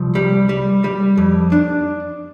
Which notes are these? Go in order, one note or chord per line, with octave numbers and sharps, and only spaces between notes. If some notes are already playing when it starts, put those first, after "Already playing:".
Already playing: C2 F3
G3
G3
G3
F2
D4